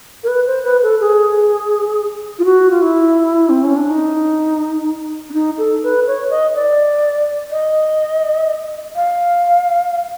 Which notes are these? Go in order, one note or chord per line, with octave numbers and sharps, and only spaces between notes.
A#4
B4
C5
B4
A4
G#4
F4
F#4
F4
E4
C4
C#4
D4
D#4
D4
D#4
A4
B4
C#5
D#5
D5
D#5
F5